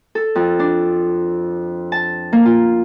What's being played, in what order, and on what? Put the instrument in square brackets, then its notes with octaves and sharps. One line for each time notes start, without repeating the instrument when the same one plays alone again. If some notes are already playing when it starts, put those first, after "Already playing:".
[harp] A4
F2
D4
A5
A#3
F4